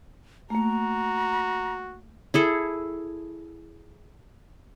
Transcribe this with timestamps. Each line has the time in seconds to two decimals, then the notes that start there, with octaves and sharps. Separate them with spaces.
0.50 A3 A#3 F#4 A#5
2.34 E4 G#4 A4